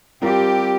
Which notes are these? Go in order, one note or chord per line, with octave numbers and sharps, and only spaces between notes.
G3 C4 F4 G4 A#4